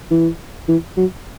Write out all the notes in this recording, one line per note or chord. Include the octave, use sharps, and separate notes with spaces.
E3
E3
F#3